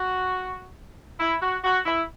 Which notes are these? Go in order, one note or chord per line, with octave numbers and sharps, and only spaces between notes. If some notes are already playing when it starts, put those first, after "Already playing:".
Already playing: F#4
E4
F#4
F#4
E4